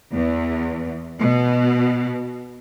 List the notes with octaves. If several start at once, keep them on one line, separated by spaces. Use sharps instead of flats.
E2
B2